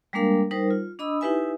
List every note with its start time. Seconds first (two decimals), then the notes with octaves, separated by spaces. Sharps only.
0.13 G3 G#3 A#3 D4 A#4 F5
0.51 G3 D#4 A#4 C5
0.71 F4
0.99 D4 D#5 B5 D#6 E6
1.21 D#4 E4 G4 B4 E5 G#5